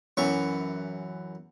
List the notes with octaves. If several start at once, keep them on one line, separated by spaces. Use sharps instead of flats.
F#2 E3 C#6